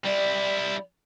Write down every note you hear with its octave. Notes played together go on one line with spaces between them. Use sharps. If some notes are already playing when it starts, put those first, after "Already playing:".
G3 E4 D5